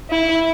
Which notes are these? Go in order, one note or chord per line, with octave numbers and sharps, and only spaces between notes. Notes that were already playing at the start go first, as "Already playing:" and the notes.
E4